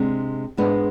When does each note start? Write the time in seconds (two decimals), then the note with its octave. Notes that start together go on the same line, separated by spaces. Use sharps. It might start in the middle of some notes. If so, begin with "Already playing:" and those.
Already playing: C3 G#3 D4
0.57 G#2 G#3 B3 D4